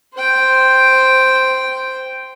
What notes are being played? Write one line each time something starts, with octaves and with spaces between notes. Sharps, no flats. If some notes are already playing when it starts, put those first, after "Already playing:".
C5 G5